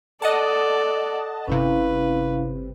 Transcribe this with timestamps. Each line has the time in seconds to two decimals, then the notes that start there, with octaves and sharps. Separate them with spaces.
0.22 A4 D5 D#5 F#5 A5
1.48 G1 C3 C#4 E4 B4 F5